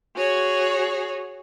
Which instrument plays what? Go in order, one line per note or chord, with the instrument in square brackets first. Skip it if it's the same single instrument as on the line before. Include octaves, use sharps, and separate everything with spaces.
[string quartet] F#4 G#4 C#5